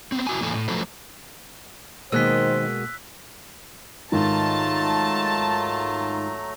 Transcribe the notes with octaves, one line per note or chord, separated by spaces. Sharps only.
B3 C4
E4 F#4 G#5
E2 A2 E3 A#3 A4 G#5
A2
F3 F#3 A3 A4 B4 C5
B2 D#3 G#3 A#3 C5 E6 F#6 B6
G#2 D#3 F#3 A3 F4 A5 A#5